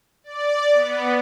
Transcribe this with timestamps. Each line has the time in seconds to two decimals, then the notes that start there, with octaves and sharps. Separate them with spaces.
0.24 D5
0.73 B3